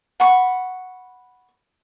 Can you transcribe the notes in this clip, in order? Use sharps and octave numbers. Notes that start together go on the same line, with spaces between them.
F#5 B5 C#6